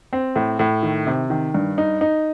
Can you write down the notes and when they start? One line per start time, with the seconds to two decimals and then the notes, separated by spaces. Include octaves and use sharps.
0.13 C4
0.36 A2
0.59 A2
0.83 D#3
1.07 C3
1.30 D#3
1.54 G2
1.78 D#4
2.01 D#4